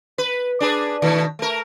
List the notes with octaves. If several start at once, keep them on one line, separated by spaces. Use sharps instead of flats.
B4
D4 G#4 B4
B2 D#3 A3
A3 A#4